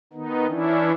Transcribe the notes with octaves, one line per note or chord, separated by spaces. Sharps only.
D#3 B3 D#4
E3 C#4 D4 E4